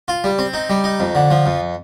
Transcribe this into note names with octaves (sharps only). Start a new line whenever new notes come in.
F4
G3
C4
D#4
G3
D#4
F2
D3
F3
F2